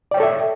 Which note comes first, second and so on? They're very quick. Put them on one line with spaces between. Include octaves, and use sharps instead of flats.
D5 G5 C#5 A4 E5